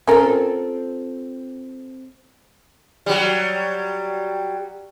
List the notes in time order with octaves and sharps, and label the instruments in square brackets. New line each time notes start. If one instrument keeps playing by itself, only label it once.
[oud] C4 F4 A4 [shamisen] C#4 A#4
[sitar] F#3 G3